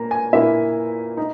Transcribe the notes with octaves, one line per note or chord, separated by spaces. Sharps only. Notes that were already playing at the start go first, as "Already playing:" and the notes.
Already playing: A#2 A#3 A#5
G#5
A#2 A#3 E4 E5
D#4